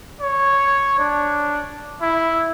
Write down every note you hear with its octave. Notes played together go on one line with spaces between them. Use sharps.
C#5
D4
E4